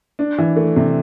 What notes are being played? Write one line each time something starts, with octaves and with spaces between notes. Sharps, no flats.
D4
E3
A3
C3